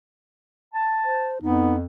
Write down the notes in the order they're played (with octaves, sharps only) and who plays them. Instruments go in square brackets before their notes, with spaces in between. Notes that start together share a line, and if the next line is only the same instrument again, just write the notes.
[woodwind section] A5
[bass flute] C5
[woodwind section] F2 [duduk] B3 [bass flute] D#4